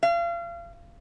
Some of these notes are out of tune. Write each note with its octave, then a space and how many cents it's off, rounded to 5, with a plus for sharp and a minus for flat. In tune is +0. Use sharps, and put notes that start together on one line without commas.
F5 -35